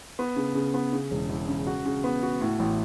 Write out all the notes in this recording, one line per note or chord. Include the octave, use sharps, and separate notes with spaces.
B3
C#3
C#3
B3
C#3
E1
E2
C#3
F#4
C#3
B3
F#4
A2
A1